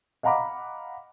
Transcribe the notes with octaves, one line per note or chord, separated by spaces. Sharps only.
D#5 F5 F#5 A#5 B5 D6